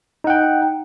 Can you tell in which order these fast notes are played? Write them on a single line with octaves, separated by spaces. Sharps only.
D#4 F#5 G5